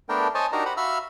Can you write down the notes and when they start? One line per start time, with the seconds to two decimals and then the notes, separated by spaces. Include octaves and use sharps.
0.09 A3 B3 D4 A#4 G5
0.35 C5 C#5 D#5 G#5 A5
0.52 D4 D#4 F#4 G4 A#4 A#5
0.65 G4 C5 F#5 B5
0.77 F#4 E5 F5 B5 E6 F6